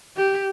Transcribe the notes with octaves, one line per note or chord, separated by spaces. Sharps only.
G4